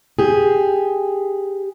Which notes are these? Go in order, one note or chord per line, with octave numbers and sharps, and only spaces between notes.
G4 G#4